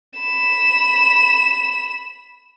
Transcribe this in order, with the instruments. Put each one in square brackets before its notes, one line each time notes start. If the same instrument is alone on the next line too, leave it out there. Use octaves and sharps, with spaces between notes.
[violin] B5 E7